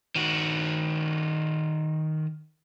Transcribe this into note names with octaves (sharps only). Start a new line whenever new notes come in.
D#3 F#4